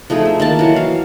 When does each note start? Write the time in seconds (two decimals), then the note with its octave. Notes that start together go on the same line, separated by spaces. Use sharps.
0.10 F3 A3 D#4 G#4
0.25 E5
0.40 D#3 A#3 A5
0.59 E3 F#3
0.76 F5